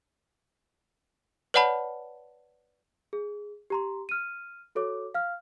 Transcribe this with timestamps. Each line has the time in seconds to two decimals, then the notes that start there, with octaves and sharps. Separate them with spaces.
1.54 B4 C#5 D5 F#5 A5 B5
3.13 G#4
3.70 G4 A#5 C6
4.09 F6 D#7
4.75 F#4 A4 C#5 D6
5.14 F5 F6